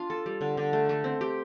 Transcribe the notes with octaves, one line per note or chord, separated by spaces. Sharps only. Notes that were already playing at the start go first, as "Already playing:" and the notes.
Already playing: D4 F4
A4
G3
D3
D3
A3
A3
C4
G4